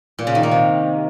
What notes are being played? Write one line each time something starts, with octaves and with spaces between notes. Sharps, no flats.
A#2
C#3
D#3
A#3
C3